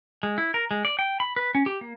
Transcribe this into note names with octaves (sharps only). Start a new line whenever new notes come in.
G#3
E4
A#4
G#3
D5
G5
B5
B4
C#4
G4
A#3